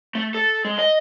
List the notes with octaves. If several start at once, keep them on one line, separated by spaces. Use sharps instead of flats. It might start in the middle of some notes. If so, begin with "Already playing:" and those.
A3
A4
G#3
D#5